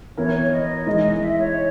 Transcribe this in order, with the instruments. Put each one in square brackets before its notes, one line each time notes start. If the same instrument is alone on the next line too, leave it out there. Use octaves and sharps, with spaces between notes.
[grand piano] E3 B3 E4 A#4 [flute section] C#5
[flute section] C#5
D#5
[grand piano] E3 G#3 D#4
[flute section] E5
C#5